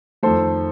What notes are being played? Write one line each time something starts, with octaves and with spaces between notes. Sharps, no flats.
F2 D#3 A3 A4 C5